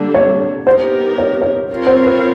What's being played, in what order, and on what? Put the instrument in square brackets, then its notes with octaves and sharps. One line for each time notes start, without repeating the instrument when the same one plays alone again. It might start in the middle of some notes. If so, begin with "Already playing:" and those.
Already playing: [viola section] D3 G3 A#3 D4
[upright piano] C#5
[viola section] B3 D#4 G4 A#4 [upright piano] C5
[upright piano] C#5
C#5
[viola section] C4 F4 A#4 C#5
[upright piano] C5
B4